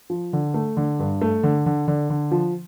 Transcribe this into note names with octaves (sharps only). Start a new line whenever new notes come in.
F3
D3
A3
D3
G2
A3
D3
D3
D3
D3
F3